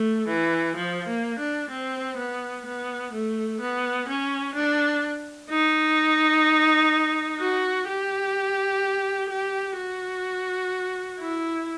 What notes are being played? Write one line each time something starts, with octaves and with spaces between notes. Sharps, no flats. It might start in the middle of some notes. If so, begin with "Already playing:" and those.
Already playing: A3
E3
F3
A#3
D4
C4
B3
B3
A3
B3
C#4
D4
D#4
F#4
G4
G4
F#4
E4